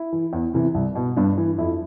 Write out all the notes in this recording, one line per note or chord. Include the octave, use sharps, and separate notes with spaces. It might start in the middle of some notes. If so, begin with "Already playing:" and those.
Already playing: E4
E3
E2
C3 E3
C2
B2
G2 D4
E3
F2 E4